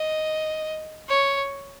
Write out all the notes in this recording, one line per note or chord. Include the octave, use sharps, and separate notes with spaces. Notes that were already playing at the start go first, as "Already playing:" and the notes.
Already playing: D#5
C#5